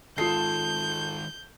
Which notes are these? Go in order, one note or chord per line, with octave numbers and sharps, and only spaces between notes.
D#3 G#3 F4 A4 D#6 G6 C7